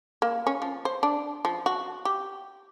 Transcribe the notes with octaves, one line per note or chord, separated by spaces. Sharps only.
A#3
C#4
F3
C5
D4
F3
F#4
G4